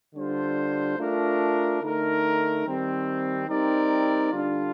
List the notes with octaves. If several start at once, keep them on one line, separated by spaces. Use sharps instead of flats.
D3 G3 D4 F4 C5
A3 D4 F4 A#4
D3 A3 D#4 A#4
D#3 G3 C4
G3 C4 D#4 A#4 D5
D3 G3 D4 F4